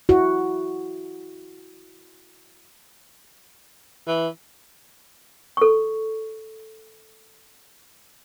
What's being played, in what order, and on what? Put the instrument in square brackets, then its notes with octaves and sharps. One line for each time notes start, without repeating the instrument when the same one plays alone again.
[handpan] E4 F#4
[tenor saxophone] E3
[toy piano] A4 C#6